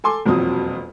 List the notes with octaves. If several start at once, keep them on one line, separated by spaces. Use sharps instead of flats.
A4 G#5 C6 D6
E1 F2 A#2 F#3 C4 D#6